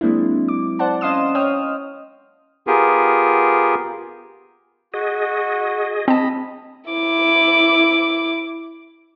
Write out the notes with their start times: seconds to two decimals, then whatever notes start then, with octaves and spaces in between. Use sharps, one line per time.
0.01 F#3 G#3 A#3 C4 D4 E4
0.48 D6
0.79 C5 D5 F#5 A5
1.01 C#4 D#5 F5 C6 D#6 E7
1.35 C#5 D#5 G5 D#6 F6
2.67 B3 F4 G4 G#4 A#4
4.94 F#4 G#4 D#5
6.08 C4 D#5 A5 B5
6.90 E4 D6